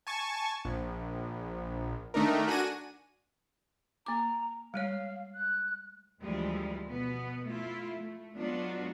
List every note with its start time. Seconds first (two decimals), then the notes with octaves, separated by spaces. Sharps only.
0.07 G#5 A5 C#6
0.65 A#1
2.14 D#3 A3 D4 D#4 A#4
2.47 D4 F#4 G#5 A#6 D#7
4.06 A#3 A#5 D6
4.74 G3 G#3 C#5 F5
5.34 F#6
6.22 D2 E3 F3 G3 G#3 F4
6.88 B2 B3 B4
7.45 A3 E4 F4
7.96 A3
8.35 F#3 G#3 B3 D4 F4 F#4